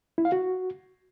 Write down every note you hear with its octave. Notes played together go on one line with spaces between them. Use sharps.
E4
F5
F#4